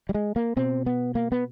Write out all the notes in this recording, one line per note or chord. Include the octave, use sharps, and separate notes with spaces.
G3
G#3
A#3
B2 C4
B3
A#3
B3